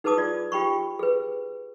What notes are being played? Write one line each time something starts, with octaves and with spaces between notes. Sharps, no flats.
D#4 G#4 B4 A5 D6 D#6
F4 D5
F4 G4 G5 B5 C#6
G#4 B4